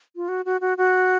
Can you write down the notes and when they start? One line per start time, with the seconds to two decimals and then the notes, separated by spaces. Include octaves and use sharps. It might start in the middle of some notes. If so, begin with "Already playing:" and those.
0.16 F4
0.28 F#4
0.45 F#4
0.61 F#4
0.78 F#4